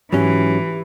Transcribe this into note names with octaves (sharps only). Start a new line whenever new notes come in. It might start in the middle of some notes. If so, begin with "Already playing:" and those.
G#2 E3 F#3 C#4 G4